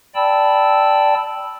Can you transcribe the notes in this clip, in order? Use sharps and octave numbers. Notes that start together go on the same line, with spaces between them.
D5 G5 A5 B5 E6